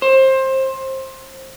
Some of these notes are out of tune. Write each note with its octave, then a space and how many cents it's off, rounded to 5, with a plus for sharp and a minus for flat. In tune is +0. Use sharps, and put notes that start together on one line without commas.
C5 +20